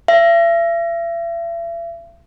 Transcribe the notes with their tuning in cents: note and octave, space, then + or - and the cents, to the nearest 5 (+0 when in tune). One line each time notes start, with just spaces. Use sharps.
E5 +40